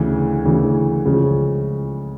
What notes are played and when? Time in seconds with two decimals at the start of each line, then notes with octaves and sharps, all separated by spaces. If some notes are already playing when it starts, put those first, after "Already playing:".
Already playing: D2 C#3 E3
0.44 D2 C#3 E3
1.05 C#2 C#3 F3